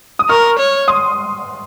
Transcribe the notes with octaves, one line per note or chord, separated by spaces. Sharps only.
D#6
A#4 C#6 F6
C#5
C6 D#6